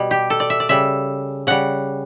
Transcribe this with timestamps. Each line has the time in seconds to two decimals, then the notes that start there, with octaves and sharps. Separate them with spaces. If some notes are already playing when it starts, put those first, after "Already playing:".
Already playing: B2 G3
0.11 G4
0.30 A4
0.40 D5
0.50 E5
0.60 D5
0.69 C#3 G3 E5
1.47 C#3 G3 F#5